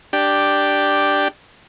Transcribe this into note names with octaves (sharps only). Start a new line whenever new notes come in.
D4 G4